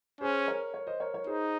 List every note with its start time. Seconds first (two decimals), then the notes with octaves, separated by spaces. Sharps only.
0.21 C#4 G#4 C5
0.48 A#4 C#5
0.74 A#4 C#5
0.87 C5 D#5
1.00 A#4 C#5
1.14 A#4 C#5
1.27 D#4 G#4 C5